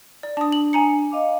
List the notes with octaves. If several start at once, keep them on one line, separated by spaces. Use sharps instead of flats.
D5
D4 A5 D#6
F#7
G#5 A#5 C#7
D#5 F5 D6